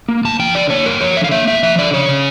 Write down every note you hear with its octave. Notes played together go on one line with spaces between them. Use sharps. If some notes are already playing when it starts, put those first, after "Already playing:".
A#3
G2 A5
F3 G5
D3 D5
A#3 C#5
G2 A#4
F3 C#5
D3 E5
F5
A#3 E5
G2 E5
F3 E5
D3 D5
C#3 C#5
C#3